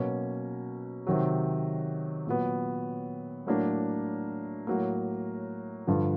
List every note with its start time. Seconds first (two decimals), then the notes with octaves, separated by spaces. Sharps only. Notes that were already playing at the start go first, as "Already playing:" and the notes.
Already playing: B2 F#3 A#3 C#4
1.07 C3 D#3 F#3
2.27 A#2 F#3 B3
3.47 A2 F#3 A#3 D4
4.67 A2 F#3 A#3
5.87 G2 D3 F3